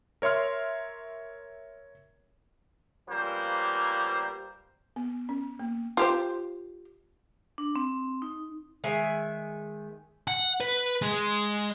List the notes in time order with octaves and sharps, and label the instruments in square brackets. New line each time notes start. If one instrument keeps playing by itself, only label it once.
[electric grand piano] A#4 C#5 E5 C6 F6
[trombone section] C#3 F3 G3 A#3 B3 C5
[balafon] B3
C#4
A#3
[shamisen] F4 G4 C5
[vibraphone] D4
C4
D#4
[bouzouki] D#3 G#3 E5 G#5
[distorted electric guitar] F#5
B4
G#3